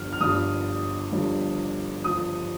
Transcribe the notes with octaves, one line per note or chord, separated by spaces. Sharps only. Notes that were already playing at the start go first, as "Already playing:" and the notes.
Already playing: G1 G2 F3 F6
F6
G1 G2 F3 D#6
G1 G2 F3
F3 D#6